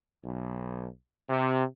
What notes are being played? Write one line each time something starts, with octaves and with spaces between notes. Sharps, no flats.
B1
C3